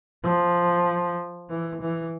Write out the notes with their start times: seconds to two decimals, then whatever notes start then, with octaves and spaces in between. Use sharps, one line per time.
0.23 F3
1.50 E3
1.81 E3